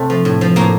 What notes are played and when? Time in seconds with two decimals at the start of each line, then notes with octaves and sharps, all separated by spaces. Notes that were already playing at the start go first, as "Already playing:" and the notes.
Already playing: C3 A3 C4
0.10 F3
0.25 A2
0.41 F3
0.56 A2 A#3